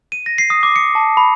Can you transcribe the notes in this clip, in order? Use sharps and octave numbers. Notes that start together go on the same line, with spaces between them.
D#7
A#6
C7
D#6
D6
C#7
A5
B5